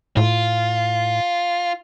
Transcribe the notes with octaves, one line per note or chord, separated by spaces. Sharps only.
A2 F4